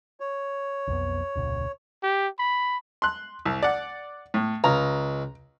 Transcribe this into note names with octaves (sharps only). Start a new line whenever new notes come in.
C#5
B1 F2 B3
E1 C#2 A#2
G4
B5
C6 F#6
C2
D5 F#5
A2
C#2 A#5